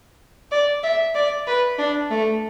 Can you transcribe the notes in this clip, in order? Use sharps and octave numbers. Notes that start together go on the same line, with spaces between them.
D5
E5
D5
B4
D4
A3